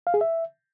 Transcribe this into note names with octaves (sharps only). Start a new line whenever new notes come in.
F5
G#4
E5